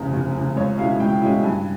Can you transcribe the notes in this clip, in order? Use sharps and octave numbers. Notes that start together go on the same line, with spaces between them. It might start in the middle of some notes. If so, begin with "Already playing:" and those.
Already playing: F1 E2 C#3
F1
E2 C#3
C#2 C#5
B2 G#3 C#4 E4 F5
C#2 G5
B2 G#3 C#4 E4
G2 G#5